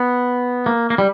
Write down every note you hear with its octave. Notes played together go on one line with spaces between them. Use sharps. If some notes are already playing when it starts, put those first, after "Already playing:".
Already playing: B3
A#3
A#3
G3